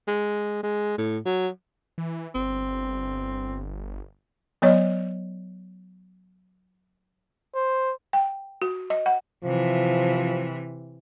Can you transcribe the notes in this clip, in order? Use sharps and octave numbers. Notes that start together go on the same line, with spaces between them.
G#3
G#3
A2
F#3
E3
G1 C4
F#3 B3 C#5 D#5
C5
G5
F#4
D#5
F#5
C3 E3 F3